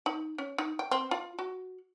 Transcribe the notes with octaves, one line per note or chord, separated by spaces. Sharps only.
D#4
C#4
D#4
G5
C4
F4
F#4